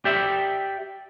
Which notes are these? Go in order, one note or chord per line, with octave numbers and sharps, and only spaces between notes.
G4 D5 E5